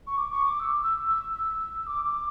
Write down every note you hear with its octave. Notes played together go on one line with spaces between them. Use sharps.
C#6
D6
C#6
D6
E6
E6
E6
E6
D6
D6